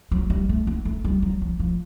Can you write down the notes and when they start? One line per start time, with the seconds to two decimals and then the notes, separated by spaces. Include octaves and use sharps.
0.11 F#3
0.30 G3
0.49 A3
0.67 A#3
0.85 A3
1.04 G3
1.22 F#3
1.41 F3
1.59 F3